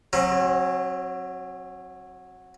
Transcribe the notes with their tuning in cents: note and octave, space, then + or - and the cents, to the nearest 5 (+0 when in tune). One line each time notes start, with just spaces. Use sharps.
F#3 -10 C4 +40